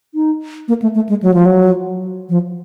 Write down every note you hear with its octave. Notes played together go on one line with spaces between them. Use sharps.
D#4
A#3
A3
A3
G#3
F#3
F3
F#3
F3